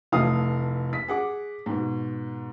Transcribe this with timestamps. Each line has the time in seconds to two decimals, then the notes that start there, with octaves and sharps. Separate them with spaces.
0.12 F1 E3 A3 F5 D#6
0.93 B6
1.08 G#4 F#5 D6
1.66 G#2 B2